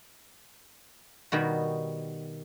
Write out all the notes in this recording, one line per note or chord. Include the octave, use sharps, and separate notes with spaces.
B2 D#3 G3 F#4